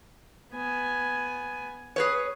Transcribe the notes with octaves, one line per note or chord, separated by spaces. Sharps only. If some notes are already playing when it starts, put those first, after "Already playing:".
B3 G#5
G#4 B4 C#5